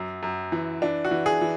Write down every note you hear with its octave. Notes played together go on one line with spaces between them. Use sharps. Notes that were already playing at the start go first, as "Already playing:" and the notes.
Already playing: F#2 F#3
F#2
E3
E3 D4
F#4
E3
G#4
E3